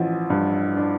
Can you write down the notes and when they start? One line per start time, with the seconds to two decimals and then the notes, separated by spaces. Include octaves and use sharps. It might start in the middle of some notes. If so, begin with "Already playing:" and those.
Already playing: A1 F3
0.30 G2
0.77 D4